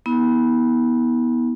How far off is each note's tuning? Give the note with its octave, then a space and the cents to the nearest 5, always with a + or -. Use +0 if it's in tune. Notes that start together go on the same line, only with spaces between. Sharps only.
B3 -20 E4 -45